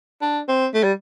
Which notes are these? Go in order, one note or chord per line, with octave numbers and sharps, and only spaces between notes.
D4
C4
A3
G3